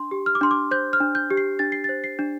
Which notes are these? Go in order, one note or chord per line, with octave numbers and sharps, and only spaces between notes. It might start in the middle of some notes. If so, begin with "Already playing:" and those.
Already playing: D4 C6
G4
F6
D6
D4 C6
D6
C5 G6
F6
D4
G6
G4
C7
D4 A6
C7
C5 A6
C7
D4